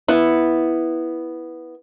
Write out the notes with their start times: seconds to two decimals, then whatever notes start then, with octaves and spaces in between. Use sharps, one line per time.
0.08 B3 E4